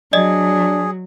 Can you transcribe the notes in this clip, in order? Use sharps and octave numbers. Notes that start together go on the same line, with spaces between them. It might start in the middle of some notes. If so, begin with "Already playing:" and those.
F#3 D4 G#4 D5 D#5